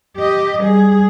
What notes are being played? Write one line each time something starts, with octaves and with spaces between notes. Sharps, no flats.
G4 D#5
G3 G#4